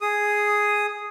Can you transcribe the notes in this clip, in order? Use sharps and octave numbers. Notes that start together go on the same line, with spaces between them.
G#4 D#6